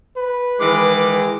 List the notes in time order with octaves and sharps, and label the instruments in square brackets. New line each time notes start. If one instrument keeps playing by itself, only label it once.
[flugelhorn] B4
[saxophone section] D#3 E3 G#3 [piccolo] D6